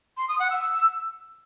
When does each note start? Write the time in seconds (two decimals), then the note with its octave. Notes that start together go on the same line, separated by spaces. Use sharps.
0.17 C6
0.28 D#6
0.39 F#5
0.51 E6